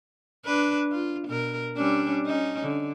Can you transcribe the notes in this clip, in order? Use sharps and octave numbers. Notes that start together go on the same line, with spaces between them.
D4 B4
F4
B2 A#4
G3 C#4 D4
C#4 D#4
D3